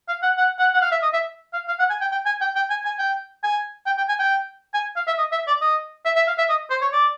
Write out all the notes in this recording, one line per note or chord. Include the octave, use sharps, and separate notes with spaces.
F5
F#5
F#5
F#5
F#5
F5
E5
D#5
E5
F5
F5
F#5
G#5
G5
G5
G#5
G5
G5
G#5
G#5
G5
G#5
G5
G5
G#5
G5
G#5
F5
E5
D#5
E5
D5
D#5
E5
E5
F5
E5
D#5
C5
C#5
D5